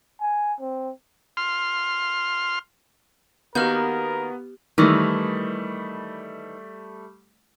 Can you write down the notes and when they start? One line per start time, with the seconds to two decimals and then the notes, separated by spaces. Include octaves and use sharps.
0.21 G#5
0.60 C4
1.37 C6 F6
3.55 D#3 A#3 B3 F#4 G4 A#4 F6 G6
4.78 D#3 E3 G3 A3